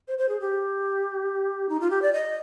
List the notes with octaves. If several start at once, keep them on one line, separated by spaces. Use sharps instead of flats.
C5
C5
G#4
G4
D#4
F4
G4
D5
D#5